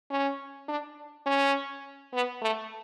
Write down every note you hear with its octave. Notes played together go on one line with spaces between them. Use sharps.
C#4
D4
C#4
B3
A3